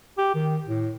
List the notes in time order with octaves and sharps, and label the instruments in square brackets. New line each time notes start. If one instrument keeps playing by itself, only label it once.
[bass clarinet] G4
D#3
A2